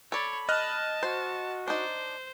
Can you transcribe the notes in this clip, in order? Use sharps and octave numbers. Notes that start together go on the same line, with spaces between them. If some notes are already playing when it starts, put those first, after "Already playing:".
A4 C#5 D5 B5
D#5 A5 F6 F#6
F#4 C5
D4 D#4 C5